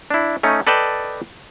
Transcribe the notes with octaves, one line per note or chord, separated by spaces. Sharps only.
D4 E4
A3 C#4 D#4
A4 B4 D5 D#5 G5 A5